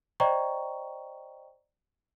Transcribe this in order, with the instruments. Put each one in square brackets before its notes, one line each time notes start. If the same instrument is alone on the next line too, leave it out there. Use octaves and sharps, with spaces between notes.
[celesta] C5 D5 D#5 G5 A#5 C#6